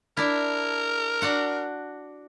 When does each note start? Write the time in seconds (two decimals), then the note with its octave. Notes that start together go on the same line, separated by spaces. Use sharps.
0.17 D4 E4 A#4
1.22 D4 F#4 F#5